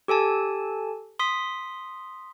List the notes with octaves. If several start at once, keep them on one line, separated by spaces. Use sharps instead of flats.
G4 A4 G#5 A5
C6 D#6 B6